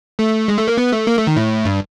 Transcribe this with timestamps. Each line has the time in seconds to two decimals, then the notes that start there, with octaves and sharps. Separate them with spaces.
0.19 A3
0.48 G#3
0.58 A3
0.68 A#3
0.78 B3
0.92 A3
1.07 A#3
1.17 A3
1.27 D#3
1.36 A2
1.65 G2